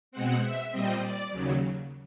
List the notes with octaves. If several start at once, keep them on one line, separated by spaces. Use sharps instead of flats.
B2 G#3 C4 F#5
E5
A#2 G3 C4 D#5
D5
D#2 C#3 F#3